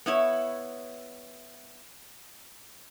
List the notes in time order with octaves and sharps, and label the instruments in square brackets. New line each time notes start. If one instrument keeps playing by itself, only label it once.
[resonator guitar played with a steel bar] B3 E4 C#5